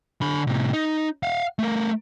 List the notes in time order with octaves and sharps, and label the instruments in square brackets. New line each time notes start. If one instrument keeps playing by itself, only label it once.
[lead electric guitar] D3 B5
A2 C3
D#4
F5 F#5
A3 A#4